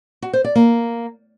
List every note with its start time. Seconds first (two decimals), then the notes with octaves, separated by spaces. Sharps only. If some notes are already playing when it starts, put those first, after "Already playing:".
0.22 F#4
0.33 C5
0.44 D5
0.55 A#3